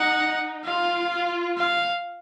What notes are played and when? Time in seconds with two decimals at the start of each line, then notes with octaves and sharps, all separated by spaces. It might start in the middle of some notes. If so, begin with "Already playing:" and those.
Already playing: D#4 F#5
0.65 F4 F5
1.12 F4
1.58 F5